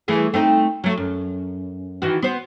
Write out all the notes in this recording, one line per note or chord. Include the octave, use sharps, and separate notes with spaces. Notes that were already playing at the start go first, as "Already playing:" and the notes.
E3 A3 G#4
A3 C4 D#4
F#3 A3
F#2
D#3 E3 F#4
B3 C5